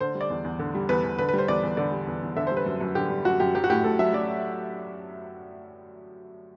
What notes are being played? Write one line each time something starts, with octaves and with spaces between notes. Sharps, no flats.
D3 C5
G3
D5
E2
E2
D3
G3
E2 B4
E2
D3 B4
B4
G3 C5
E2 D5
E2
D3 D5
G3
E2
E2
D3 E5
C5
G3
B4
F#2
F#2
D3 G4
G3
F#2 F#4
F#2 G4
F#3 G4
F#4
A2 G4
A2 A4
F#3 E5
F#3 D5